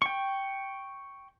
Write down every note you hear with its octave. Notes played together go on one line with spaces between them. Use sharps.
G5 C#6